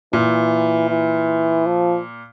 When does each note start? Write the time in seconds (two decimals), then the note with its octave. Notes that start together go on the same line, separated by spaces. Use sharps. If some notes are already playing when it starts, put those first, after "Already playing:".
0.13 A#2 E3
0.89 E3
1.66 F3